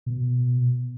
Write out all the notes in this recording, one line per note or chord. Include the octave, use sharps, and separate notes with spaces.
B2